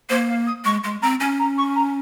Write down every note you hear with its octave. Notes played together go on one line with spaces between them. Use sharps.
A#3 C5
F5
D#6
G#3 C#6
G#3 C6
C4 A#5
C#4 G#5
A#5
C#6
A#5